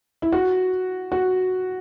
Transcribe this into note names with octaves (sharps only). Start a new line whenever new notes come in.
E4
F#4
F#4